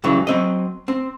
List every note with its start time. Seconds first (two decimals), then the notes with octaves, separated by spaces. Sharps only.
0.04 G2 C#3 E3 F#3
0.27 F#3 C4 D#5
0.88 C4